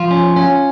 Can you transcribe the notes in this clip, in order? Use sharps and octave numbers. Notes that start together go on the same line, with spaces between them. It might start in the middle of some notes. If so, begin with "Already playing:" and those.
Already playing: F3 F4
C#4
C#4